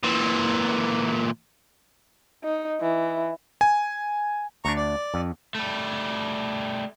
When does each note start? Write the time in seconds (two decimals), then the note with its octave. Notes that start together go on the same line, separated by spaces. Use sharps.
0.04 A#2 E3
2.44 D#4
2.81 E3
3.61 G#5
4.65 D2 D4 A#5 C#6
4.77 D5
5.14 F2
5.55 G3 A3